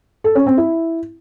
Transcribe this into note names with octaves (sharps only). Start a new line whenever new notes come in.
A4
C#4
C4
E4